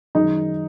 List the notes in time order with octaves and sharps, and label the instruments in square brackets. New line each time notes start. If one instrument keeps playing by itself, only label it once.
[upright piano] F#2 D#3 G#3 D#4